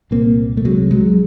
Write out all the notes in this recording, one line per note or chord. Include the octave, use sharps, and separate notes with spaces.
C2 A#2 A#3 C4
A3
C2 C3 F#3 G#3
F#3 G#3